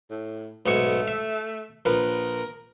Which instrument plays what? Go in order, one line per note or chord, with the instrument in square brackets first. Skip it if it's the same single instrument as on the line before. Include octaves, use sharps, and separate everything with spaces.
[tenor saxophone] A2
[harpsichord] B1 G#2 C#6 [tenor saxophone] A3
[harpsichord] E5
[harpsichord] A#1 B4 [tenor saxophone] A#4